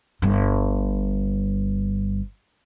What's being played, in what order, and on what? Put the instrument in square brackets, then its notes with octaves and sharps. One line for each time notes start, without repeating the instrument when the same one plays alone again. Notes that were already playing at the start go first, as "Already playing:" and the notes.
[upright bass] G1 G2